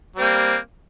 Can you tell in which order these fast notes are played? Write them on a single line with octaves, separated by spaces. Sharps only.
G3 C4 A#3